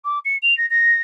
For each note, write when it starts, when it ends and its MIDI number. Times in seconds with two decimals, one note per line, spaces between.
0.04 0.19 86
0.25 0.36 97
0.42 0.56 101
0.57 0.66 94
0.70 1.01 94